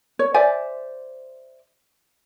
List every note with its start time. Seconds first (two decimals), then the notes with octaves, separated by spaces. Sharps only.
0.19 C#5
0.34 C5 D5 E5 G#5